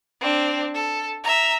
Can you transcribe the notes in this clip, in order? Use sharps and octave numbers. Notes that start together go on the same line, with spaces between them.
C4 D4
A4
E5 A#5